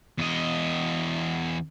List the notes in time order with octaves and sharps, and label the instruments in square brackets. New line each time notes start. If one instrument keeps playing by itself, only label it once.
[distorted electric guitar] E2 D#5